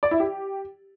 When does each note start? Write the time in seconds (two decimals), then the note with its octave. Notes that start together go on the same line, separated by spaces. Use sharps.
0.03 D5
0.11 E4
0.20 G4